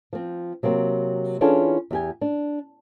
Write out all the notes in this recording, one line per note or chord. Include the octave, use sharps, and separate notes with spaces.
F3 C4
C3 F#3 A#3 C4
E3 C#4 D4 F4 G#4 A4
E2 G4 G#5
D4